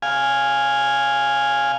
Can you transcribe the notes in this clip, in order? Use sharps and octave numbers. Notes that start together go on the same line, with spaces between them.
F5 G#5